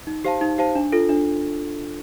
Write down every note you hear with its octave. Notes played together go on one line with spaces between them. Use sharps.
D#4
G4 C5 F5 A5
D#4
G4 C5 F5 A5
D4
F4 A4
D4